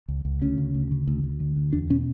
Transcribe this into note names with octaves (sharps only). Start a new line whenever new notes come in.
C#2
C#2
D2 C#4
C#3
D2
C#3
D2
D2
D3
D2
E2 D4
B2 C#4